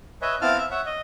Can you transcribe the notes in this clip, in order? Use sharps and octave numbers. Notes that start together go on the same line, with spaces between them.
B4 C#5 D#5 E5 G#5
B3 C4 E4 F5 A5 F6
E5
C#5 E5 F#5
D#5